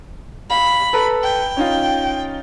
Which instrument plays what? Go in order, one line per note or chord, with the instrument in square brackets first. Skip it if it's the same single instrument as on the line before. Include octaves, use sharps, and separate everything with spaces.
[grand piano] F5 [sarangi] B5
[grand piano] A4 B4 A#5
[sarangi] G5
[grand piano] C#4 D#4 F4